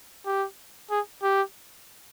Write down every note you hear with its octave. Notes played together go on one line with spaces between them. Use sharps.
G4
G#4
G4